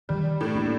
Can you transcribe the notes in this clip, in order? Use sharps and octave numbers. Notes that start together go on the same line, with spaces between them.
D#3 G3
A2 A3
A#3 D4